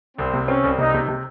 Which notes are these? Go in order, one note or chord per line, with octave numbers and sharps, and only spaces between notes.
C2 C4
C3
C4 C#4
C2
C3 D#4
C3
C3